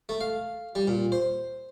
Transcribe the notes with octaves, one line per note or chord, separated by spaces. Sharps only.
A3
F5
G3
A#2
C5